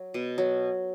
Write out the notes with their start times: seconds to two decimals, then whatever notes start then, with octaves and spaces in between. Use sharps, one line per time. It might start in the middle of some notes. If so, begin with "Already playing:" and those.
Already playing: F#3
0.14 B2
0.38 F#3